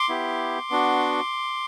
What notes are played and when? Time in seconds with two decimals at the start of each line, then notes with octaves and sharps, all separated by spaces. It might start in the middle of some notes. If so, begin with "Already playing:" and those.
Already playing: C6 D6
0.09 B3 E4 G4
0.70 B3 D4 F#4